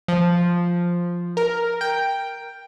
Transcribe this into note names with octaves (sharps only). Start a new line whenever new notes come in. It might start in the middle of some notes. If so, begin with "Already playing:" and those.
F3
A#4
G5